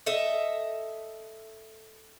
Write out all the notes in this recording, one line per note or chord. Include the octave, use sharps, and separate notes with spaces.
A4 D#5 E5